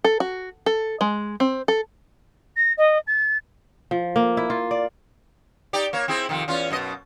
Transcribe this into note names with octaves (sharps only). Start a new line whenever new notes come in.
A4
F#4
A4
G#3
C4
A4
A#6
D#5
A6
F3
A#3
E4
F4
D5
D#4 G4 D5
A#3 C#5
C4 E4 G#4
F2 C3 D#3
E2 C#4 F4
F#2 B2 D#5